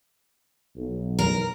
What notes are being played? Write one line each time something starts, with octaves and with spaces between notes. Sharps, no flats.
B1
A#4